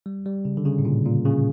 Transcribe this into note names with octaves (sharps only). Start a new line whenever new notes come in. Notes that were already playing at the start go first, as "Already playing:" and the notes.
G3
G3
C#3
D3
C#3
A2
A#2
A#2
C#3